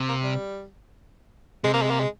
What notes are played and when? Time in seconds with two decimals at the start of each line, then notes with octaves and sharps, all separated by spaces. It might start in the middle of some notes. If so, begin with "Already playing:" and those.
Already playing: C3
0.09 A#3
0.24 G3
1.64 C3 G#3
1.74 A#3
1.82 G#3
1.91 A#3
2.00 G#3